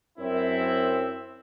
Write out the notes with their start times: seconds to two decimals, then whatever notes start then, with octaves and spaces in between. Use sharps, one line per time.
0.18 F#2 C4 E4